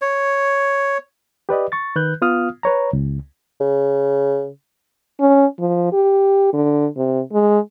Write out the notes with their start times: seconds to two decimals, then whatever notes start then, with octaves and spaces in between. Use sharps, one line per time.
0.02 C#5
1.49 G4 B4 D5 D#5
1.72 C#6 A6
1.96 D#3 B4 F#6 G6
2.22 B3 F4 F5 D#6 F6
2.63 B4 C#5 A#5
2.93 C#2
3.61 C#3
5.20 C#4
5.59 F3
5.93 G4
6.53 D3
6.97 C3
7.33 G#3